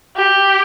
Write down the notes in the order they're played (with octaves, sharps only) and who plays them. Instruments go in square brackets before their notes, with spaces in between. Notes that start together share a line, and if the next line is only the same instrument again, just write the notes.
[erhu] G4